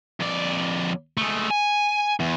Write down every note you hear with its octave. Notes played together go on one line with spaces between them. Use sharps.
F2 D5
G#3 A3
G#5
E2